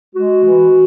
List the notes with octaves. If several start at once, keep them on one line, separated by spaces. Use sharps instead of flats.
G#3 F#4
E3